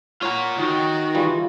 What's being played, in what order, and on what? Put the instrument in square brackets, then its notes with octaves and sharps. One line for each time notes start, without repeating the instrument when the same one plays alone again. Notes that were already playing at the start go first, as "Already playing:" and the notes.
[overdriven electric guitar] F4 A#5 [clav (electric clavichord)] C#5 F#5
[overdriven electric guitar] D#3 [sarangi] F#4
[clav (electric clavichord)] E3 G3 [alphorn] F4